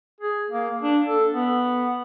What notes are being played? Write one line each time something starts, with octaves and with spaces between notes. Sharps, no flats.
G#4
A#3
D4
A4
B3